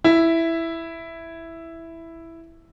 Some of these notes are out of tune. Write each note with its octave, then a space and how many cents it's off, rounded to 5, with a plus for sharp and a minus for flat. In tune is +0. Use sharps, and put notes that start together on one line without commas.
E4 +0